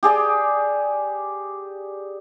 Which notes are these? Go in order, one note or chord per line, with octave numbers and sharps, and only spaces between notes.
G4 G#4 D5 G5